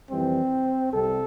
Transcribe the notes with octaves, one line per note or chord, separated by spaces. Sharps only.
F2 E3 G3 C4
C2 C3 G3 A4